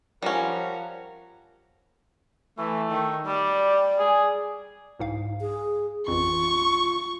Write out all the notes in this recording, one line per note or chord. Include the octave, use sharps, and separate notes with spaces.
F3 G3 C#4 A#4 F#5 A#5
E3 A3
D#3
G3 D5
G#4
C2 G#2 F5
G#4
A1 F2 F4 C#6